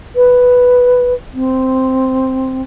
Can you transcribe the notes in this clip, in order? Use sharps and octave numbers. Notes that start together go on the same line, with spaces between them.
B4
C4